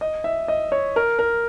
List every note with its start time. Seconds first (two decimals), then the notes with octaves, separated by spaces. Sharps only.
0.01 D#5
0.24 E5
0.48 D#5
0.72 C#5
0.96 A#4
1.19 A#4